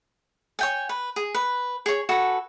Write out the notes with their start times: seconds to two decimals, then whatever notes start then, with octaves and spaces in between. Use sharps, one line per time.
0.59 C#5 G5 G#5
0.89 B4
1.16 G#4
1.34 B4
1.86 G#4 C#5
2.09 F#4 A4 B4 G#5